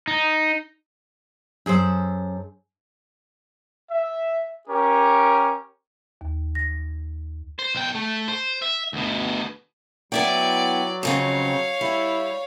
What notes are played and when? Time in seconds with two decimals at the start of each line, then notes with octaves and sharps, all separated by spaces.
0.07 D#4
1.66 F#2 G#4 A4 C5
3.91 E5
4.68 C#4 G4 A#4
6.21 D#2
6.55 A#6
7.59 C5
7.75 B1 G5
7.95 A3
8.28 C5
8.62 E5
8.93 D2 B2
10.12 F#3 B3 E4 D5 G5
11.03 F2 C#3 C4 C#5 F5
11.81 G3 E4